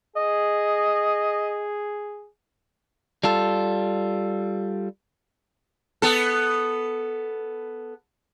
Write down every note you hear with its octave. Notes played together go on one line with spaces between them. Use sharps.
G#4 D#5
G3 F4 A4
B3 A4